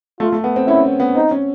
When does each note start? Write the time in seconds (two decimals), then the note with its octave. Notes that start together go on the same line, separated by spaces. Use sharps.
0.20 A3 F4
0.32 A3
0.44 B3
0.56 C4
0.68 C#4 E4
0.84 C4
1.00 B3
1.15 C4 D#4
1.31 C#4